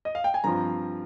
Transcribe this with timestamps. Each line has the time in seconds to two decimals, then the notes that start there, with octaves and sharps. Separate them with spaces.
0.05 D#5
0.15 F5
0.24 G5
0.34 G#5
0.44 G2 F3 C4 F4 A#5